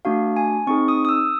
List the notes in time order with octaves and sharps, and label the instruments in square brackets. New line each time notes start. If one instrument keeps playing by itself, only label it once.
[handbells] A3 D4 F#4 F5
G#5
C4 D#4 G#4 C#6
D#6
D#6
E6